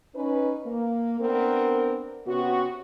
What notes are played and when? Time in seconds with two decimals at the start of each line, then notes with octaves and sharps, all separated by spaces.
0.15 C#4 D#4 B4
0.66 A#3
1.20 B3 C4 D4 A#4
2.27 C3 B3 C#4 F#4